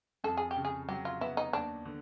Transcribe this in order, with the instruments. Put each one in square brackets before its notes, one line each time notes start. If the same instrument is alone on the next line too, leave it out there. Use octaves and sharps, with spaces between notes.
[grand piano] F2 [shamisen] A4
[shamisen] G#4
G4
[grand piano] C#3
[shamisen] G#4
[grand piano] F#3 [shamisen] G4
[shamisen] F4
[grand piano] B3 [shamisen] E4
[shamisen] D#4
[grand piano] D#2 [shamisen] D4
[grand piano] D3